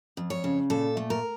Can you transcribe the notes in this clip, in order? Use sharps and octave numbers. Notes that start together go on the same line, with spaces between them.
F2
C#5
C#3
A#2 A4
A3
A#4